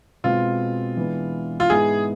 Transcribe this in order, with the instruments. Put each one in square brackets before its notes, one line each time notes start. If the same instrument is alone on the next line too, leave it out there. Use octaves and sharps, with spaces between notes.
[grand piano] B2 G#3 C4 [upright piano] F4
[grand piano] E3 G#3 B3 D4
[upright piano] F4
[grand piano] G#2 G#3 B3 E4 [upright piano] G#4